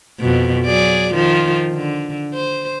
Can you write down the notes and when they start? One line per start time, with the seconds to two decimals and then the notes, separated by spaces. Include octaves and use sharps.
0.20 F2 B2
0.65 F#3 G#4 D5
1.14 D#3 F3 F4
1.73 D3
2.33 C5